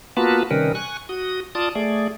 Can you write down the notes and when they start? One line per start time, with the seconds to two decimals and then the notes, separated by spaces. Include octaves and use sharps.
0.17 A#3 B3 F4 F#4 B4 A5
0.51 C3 D#3 G3 C#4 A#4 B4
0.75 G#5 C#6 F#6
1.09 F#4 D#6
1.55 F4 D5 A5 D#6
1.75 A3 G#4 D5